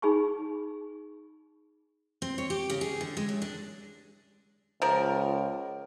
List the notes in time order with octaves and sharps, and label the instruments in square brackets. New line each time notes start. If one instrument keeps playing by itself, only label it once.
[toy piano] D#4 G#4 G#5 B5 C#6
[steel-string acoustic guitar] C4
C#5
G4
C#3
G#4
D3
G#3
F#2
D4
[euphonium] C#2 [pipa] F3 A#4